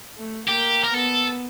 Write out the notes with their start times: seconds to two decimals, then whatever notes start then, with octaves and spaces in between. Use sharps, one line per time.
0.18 A3
0.48 A#3 G4
0.84 A#4
0.94 B3 A4